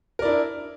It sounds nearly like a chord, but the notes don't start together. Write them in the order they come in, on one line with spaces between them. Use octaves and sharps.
A#4 D5 E4 D4